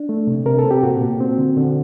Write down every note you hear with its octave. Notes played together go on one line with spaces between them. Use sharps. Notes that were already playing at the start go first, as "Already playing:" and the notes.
Already playing: D4
A3
C3
C3 A#4
A4
C4
G4
A#2 F#4
A#2
C4
D3
D3